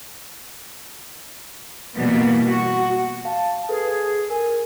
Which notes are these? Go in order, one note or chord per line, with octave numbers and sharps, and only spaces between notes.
B2 E3 G3 A#3 B3
F#4
F5 A5
G#4 A4 B4
A#4 G#5